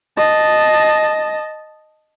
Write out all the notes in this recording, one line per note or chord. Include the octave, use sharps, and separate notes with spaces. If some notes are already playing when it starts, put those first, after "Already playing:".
D#5 A5